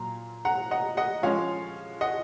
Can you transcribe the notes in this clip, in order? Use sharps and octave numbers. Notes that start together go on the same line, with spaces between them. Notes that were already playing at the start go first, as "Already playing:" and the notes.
Already playing: A#2 F#3 A#3 F4 A#5
F#5 A#5
D#5 F#5
D#5 F#5
F3 G#3 C#4 F4 C#5 F5
D#5 F#5